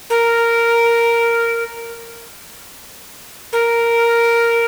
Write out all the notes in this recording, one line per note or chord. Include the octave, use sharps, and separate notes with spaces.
A#4
A#4